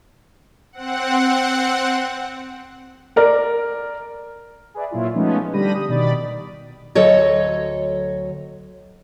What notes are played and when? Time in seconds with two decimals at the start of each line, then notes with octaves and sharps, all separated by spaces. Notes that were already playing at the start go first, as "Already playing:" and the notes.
0.73 C4 F#5
3.16 A#4 D5
4.74 G#4 B4 D5 E5
4.91 A#2 F#3 E4 F4
5.15 F3 G#3 A3 B3 C#4 D#4
5.53 D3 G3 G4 B5 A#6 D#7
5.75 D#6
5.89 B2 D#3 D5 B5 A6
6.95 D2 F#3 A4 C#5 D#5